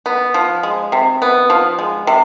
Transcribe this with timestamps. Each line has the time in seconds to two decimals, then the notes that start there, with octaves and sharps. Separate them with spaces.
0.06 B3
0.34 F3
0.63 G#3
0.92 C3
1.22 B3
1.50 F3
1.79 G#3
2.07 C3